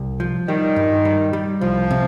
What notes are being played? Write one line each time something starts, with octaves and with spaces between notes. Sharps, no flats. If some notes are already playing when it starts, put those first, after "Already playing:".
Already playing: C2
F3
D#3 G3
G2
G3
G3
C2 F3
C3